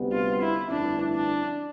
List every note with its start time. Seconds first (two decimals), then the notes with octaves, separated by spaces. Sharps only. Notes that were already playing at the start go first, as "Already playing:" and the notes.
Already playing: D2 C3 G3 B3
0.12 F4
0.41 E4
0.70 G1 F2 E3 A3 D4 E4
1.14 D4